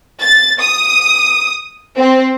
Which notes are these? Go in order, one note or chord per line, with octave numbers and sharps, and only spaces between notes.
A6
D#6
C4